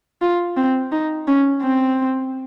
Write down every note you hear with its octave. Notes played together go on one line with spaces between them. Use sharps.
F4
C4
D#4
C#4
C4